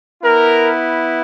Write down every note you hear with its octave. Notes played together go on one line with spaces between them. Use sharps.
B3 E4 A#4